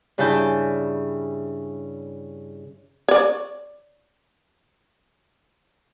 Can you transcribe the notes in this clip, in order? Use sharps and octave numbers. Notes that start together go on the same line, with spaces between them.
G2 C#3 D4 E4 A5 G6
C#5 D5